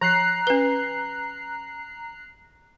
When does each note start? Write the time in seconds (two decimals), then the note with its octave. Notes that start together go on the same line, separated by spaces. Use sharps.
0.01 F3 A#5 F#6 C7
0.47 C#4 B4